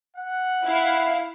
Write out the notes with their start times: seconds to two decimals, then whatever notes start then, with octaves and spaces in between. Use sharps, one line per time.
0.17 F#5
0.65 E4 F5